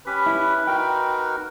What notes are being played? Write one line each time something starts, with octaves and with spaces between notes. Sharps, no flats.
C#4 G4 B4 B5
E4
D#4 F#4 A#4 G5